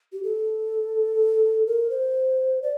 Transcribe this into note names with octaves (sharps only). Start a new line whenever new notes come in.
G4
A4
A#4
C5
D5